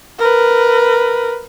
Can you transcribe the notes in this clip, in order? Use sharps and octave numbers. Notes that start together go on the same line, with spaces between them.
A#4 B4